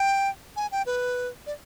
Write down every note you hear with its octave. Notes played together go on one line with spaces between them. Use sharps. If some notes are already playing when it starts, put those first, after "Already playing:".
Already playing: G5
G#5
G5
B4
D5